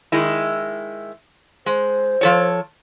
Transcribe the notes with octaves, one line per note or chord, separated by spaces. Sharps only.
D#3 G#3 E4
G#3 C5
F3 A4 C#5